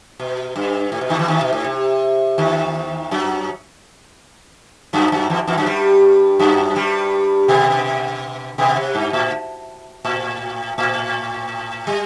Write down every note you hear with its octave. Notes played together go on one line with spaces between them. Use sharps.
B2
G2
A2
B2
D#2 D#3
E2 E3
D#2 D#3
B2
A2
C3
D#2 D#3
F#2 F#3
F#2 F#3
F#2 F#3
E2 E3
E2 E3
F#2 F#3
G2 G3
F#2 F#3
G2 G3
B2 B3
B2 B3
C3
G2
A2
A2
A2
G3